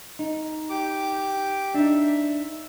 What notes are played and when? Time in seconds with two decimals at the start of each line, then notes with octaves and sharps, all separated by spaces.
0.19 D#4
0.70 G4 D6
1.74 D4 D#4 E5